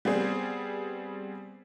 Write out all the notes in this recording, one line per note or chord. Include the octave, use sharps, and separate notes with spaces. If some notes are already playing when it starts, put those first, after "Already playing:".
G3 B3 C4 G#4